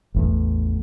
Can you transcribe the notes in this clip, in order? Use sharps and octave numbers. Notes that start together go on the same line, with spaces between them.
A1 E2 A2